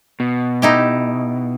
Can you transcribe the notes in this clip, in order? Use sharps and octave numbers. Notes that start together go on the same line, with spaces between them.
B2
D#4 E4 G4